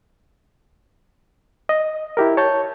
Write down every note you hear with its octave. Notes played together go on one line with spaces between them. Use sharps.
D#5
E4 G4 A#4
C#5 A5 G6